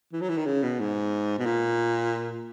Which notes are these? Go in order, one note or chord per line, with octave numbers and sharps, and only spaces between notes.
E3
F#3
E3
D#3
C#3
B2
G#2
B2
A#2